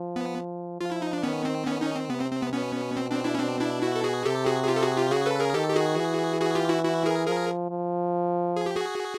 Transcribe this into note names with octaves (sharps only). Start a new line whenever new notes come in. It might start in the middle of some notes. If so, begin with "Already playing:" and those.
Already playing: F3
B3
F3 F4
E4
D#4
D4
D#3 B3 C#4
C4
D#3 B3 C#4
C#4 D#4
C4
C3 B3
C4
C4
B3
B2 B3 C#4
C4
C4 D4
D4 E4
C#4
B2 C4 D4
D4 E4
E4 F#4
A4
F#4 G#4
C3 G4 A4
F#4 G#4
G#4
F4 G4
A4
F#4 G#4
F4 G4
C#3 F#4 G#4
A4 B4
G#4 A#4
D#3 G4 A4
G4
F#4 G#4
E3
F#4 G#4
F4 G4
E4 F#4
E4 F#4
G#4 A#4
F3 G#4 A#4
F3
G#4
G4
F#4 G#4